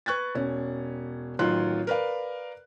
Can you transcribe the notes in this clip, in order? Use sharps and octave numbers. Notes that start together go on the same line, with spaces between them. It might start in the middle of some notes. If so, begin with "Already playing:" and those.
B4 C#6 F#6 G#6 A6
E1 C#4
A1 D#3 F#3 F4 C6 F#6
A#4 B4 D5 F5